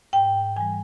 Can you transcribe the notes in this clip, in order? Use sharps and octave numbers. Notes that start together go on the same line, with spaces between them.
G#2 G5
E3 G3 G#5